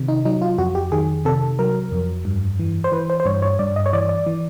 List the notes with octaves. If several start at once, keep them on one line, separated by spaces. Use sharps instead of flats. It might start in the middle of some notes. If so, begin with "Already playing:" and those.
Already playing: C3 D#3
D#4
F#3 D#4
F4
F2 F#4
G4
D#3 G#4
C3 A4
F#3 A#4
F2
G2
E3
C5
E3 B4
C5
C5
G2 C#5
C#5
G2 D5
D#5
C#5
E3 D5
D5
E3